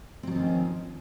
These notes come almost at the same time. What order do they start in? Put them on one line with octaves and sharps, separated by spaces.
C4 F#3 F3 D#3 C#4